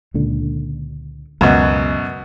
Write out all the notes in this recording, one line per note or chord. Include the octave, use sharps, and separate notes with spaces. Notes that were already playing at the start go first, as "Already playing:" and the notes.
C#2 A#2 D3
C#2 F#2 B2